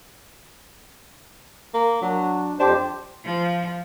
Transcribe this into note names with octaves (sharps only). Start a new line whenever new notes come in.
A#3
F#3 D4
F2 D4 G4 C5
F3